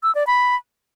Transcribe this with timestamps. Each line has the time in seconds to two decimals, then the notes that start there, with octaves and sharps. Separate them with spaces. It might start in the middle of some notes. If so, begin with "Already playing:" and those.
0.03 E6
0.15 D5
0.27 B5